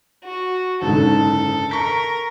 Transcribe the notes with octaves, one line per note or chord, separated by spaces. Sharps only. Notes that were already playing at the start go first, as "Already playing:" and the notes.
F#4
F#1 G#2 D3 A4
A#4 C#6 B6